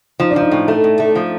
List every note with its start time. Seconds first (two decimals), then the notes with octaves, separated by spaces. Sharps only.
0.20 F3 D#4
0.30 D4
0.36 F3 D#4
0.52 A2
0.68 A3
0.84 A2
1.00 A3
1.15 F3